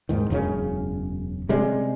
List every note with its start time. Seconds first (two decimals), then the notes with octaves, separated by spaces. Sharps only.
0.09 D#2 G#2 D#3
0.30 E1 F#2 C#3 C#4
1.49 C3 G3 G#3 C#4